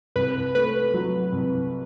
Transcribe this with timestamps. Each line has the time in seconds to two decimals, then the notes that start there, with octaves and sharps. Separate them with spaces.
0.16 C2 B4
0.55 A3 B4
0.94 F#3
1.32 C2